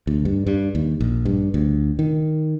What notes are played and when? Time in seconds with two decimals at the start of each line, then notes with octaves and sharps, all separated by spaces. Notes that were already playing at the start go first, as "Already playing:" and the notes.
0.07 D2
0.25 G2
0.47 G2
0.75 D#2
1.01 A#1
1.25 G2
1.54 D2
1.99 D#3